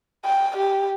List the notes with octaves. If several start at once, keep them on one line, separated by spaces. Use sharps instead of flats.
G5
G4